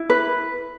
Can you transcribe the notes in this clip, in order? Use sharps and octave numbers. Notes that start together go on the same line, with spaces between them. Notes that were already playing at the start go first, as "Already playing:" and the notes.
Already playing: E4
B4